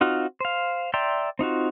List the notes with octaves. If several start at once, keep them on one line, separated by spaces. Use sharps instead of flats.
C4 D#4 F4 F#4 F5
C5 F5
D5 E5 G5 A#5 C6
C4 D#4 F4 F#4